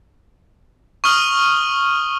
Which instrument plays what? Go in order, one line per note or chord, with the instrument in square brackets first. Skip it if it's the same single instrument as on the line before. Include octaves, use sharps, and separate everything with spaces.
[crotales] C#6 D#6 F6 F#7 G7